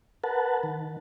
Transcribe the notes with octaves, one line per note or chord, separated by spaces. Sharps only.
A#4 B4 F#5 A5
D#3